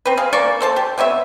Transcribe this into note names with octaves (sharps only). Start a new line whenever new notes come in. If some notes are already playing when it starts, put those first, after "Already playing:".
C4 B4
G#4 F5
A#3 D5 C#6
A4 C5 A5
G4
C3 B3 C#5 E5